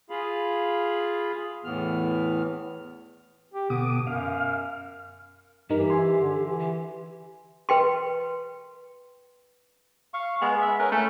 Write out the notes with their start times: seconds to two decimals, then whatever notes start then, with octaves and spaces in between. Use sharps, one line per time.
0.10 F4 G#4 F5 B5
1.64 E2 A2 E3 B3 F6
3.54 G4
3.70 B2 D3 D6 D#6
4.07 F#2 F5
5.70 G2 E3 D#4 G4 A#4
5.90 E5 G#5 C6
6.19 D3
6.43 E3
6.60 G4
7.69 B4 G5 C6
10.14 F5 C#6
10.41 G#3 B3
10.61 E5
10.79 C#4 A#4 B4
10.92 A3 C#4